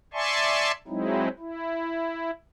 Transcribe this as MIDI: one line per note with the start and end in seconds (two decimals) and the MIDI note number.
0.14 0.72 74
0.14 0.72 76
0.14 0.72 80
0.14 0.72 81
0.14 0.72 84
0.14 0.72 85
0.88 1.28 54
0.88 1.28 56
0.88 1.28 60
0.88 1.28 63
0.88 1.28 64
1.39 2.31 64